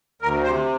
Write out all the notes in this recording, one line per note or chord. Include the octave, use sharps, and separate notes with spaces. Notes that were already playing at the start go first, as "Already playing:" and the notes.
D2 A#4
C3 C5